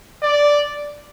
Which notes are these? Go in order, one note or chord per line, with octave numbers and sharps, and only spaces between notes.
D5